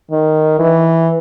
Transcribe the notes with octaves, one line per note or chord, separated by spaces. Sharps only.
D#3
E3